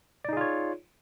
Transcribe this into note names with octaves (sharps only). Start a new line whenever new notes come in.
D#4 F4 G#4 C#5 D5